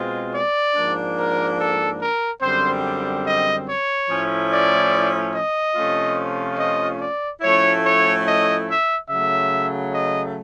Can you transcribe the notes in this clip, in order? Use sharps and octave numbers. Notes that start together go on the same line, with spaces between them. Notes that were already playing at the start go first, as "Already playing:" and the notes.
Already playing: B2 G#3 C4 F4
D5
G#2 F3 A#3 D4
A#4
A4
A#4
F#2 D3 G3 C4 C5
D#5
C#5
A2 F3 A3 C#4 E4
D5
D#5
C3 F3 A3 C#4 F4
D#5
D5
A2 F3 A3 C#4 E4 C#5
C#5
D#5
E5
C#3 F#3 A3 E5
D#5